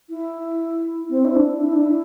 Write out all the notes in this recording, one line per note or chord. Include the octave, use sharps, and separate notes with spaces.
E4
C4
E4
D4
E4
D4
E4